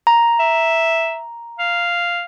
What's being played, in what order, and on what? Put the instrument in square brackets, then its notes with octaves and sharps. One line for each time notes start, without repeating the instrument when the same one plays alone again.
[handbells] A#5
[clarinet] E5
F5